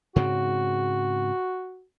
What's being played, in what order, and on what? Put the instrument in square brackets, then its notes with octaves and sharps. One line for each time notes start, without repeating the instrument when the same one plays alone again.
[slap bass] G#2 C#3 C4 [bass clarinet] F#4